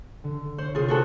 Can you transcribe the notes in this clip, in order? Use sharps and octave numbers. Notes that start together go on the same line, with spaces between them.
D3
C5 C#5
C2 C4 F4 G#4
F4 F#4 A4 C5 G#5 F#6